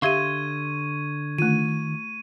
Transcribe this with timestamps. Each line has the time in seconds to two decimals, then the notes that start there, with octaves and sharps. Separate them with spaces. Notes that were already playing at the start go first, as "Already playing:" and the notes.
0.02 D3 G4 E5 F5 C6 C#6 G#6 D#7
1.38 D#3 A3 F4 D#7